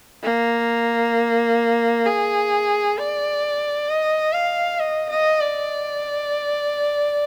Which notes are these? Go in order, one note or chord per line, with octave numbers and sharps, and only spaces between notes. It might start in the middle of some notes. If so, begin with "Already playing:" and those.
A#3
G#4
D5
D#5
F5
D#5
D#5
D5